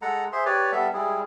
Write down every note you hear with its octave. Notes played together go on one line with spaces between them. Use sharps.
G#3 A4 F#5 A#5
G#4 C5 E5 C6
G4 B4 C#5 D5
G3 B3 A4 E5
G3 G#3 E4 G#4